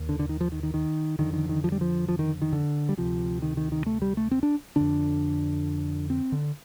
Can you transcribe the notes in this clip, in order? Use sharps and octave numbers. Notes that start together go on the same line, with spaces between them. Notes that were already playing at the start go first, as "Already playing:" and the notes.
Already playing: D#2
D3
D3
D#3
F3
D#3
D#3
D#3
F2 D3 D#3
D#3
D#3
F3
G3
F3
F3
D#3
D#3
D3
G3
D2 C3 F3
D#3
D#3
D#3
A3
G3
A3
C4
D4
F2 D3 D4
C4
D3